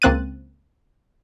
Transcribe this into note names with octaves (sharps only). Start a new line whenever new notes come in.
C#2 A#3 C4 F#6 A6 D#7